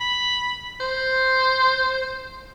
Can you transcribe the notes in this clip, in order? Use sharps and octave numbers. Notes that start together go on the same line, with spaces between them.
B5
C5